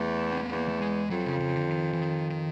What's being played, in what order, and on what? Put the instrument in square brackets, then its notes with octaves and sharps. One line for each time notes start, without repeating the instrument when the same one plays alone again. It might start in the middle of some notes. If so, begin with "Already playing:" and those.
Already playing: [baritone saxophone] E2 [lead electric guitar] A3
[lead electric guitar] C4
B3
[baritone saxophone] E2
[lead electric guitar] A#3
A3
G#3
[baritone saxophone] F2 [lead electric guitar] F#3
[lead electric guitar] C#3
C#3
D3
D#3
E3
D#3
D#3